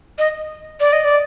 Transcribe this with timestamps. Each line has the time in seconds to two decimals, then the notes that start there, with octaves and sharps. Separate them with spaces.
0.18 D#5
0.80 D5
0.93 D#5
1.04 D5